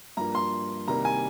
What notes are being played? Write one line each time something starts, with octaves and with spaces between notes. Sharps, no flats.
G2 F3 A#3 A#5
C6
C2 C3 D#3 G3 A#3 A#5
G#5